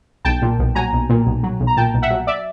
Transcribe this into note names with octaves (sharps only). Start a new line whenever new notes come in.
B1 G5 A5
A#2
B1
F#3 G#5 A#5
B1
A#2
B1
F#3
B1
A#5
A#2 G5 A5
B1
E5 F#5
F#3
D5 E5